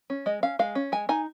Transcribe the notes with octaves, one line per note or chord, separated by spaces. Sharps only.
C#4
G#3 D#5
C#4 F5
G#3 F5
C#4
G#3 G#5
D#4 G#5